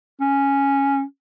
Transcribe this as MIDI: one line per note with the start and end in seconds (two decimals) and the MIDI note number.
0.21 1.02 61